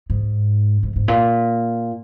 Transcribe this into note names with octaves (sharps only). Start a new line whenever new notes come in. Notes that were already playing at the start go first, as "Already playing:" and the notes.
G#2
G#2
G#2
A#2